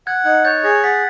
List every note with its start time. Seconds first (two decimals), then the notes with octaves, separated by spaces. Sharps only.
0.07 F#5 F#6 G#6
0.25 D#4 F#6 G#6
0.44 C#5 G6 A6
0.64 G#4 G#6 A#6
0.83 F#5 A6 B6